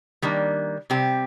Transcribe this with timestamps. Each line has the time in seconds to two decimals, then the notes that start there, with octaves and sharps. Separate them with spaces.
0.22 D#3 G3 A#3 D4
0.90 C3 G3 C4 G4